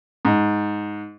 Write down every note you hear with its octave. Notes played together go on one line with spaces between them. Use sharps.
G#2